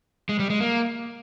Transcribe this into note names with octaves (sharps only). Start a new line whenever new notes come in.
G#3
G3
G#3
A#3